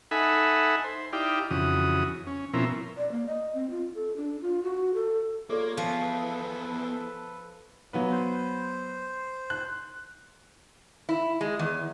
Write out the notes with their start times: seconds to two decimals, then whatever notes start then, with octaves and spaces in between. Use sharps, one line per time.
0.11 D#4 A4 E5 F#5 G#5 B5
0.84 C5
1.13 D#4 E4 G4 D5 F5 G5
1.51 F2 C#3 E3 F#4 D#6
2.27 C#4
2.54 B2 F3 C4 C#4 E4 A#4
2.97 D5
3.12 A#3
3.27 D#5
3.54 C4
3.70 F4
3.95 A4
4.17 D4
4.42 F4
4.63 F#4
4.94 A4
5.50 A#3 F4 G#4 A4 C#5 D5
5.77 E2 F3 B3
6.03 A4 B4 D#6
7.93 F#3 A#3 B3 B4
8.11 C5
9.50 F#6
11.09 E4
11.41 G#3
11.59 E2